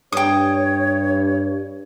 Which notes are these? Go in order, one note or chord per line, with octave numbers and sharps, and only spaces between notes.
G2 C#5 G5 D#6